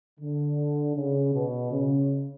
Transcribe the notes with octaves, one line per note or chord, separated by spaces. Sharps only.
D3
C#3
B2
C#3